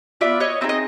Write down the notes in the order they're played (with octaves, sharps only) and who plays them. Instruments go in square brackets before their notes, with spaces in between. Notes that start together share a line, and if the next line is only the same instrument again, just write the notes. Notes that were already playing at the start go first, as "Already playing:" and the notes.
[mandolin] B3 D4 F4 D5 E5
C#5 D#5
C4 D#4 G#4 E5
D#5